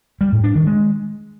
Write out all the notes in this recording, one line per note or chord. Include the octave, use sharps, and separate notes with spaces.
G3
A2
D4
D#3
G#3